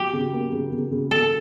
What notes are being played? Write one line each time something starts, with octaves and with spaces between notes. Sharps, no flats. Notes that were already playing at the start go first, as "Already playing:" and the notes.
Already playing: F#3 G4
C#3
A#3
C#3
C#3
C#3
C#3 A4